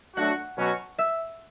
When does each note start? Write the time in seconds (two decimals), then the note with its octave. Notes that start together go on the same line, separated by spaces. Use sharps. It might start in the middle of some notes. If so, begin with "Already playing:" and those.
0.17 F#3 A3 D4 F#4 F#5
0.57 B2 F#3 C#4 F#4
0.98 E5